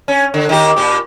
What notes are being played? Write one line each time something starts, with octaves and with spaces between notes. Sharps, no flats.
C#4
D3
D#3 A#3 G4
A#2 G4